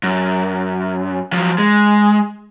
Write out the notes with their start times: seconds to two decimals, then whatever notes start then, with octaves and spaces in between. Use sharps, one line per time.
0.03 F#2
1.33 F3 F#3
1.58 G#3